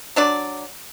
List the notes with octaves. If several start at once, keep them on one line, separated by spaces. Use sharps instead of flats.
F#3 D4 D5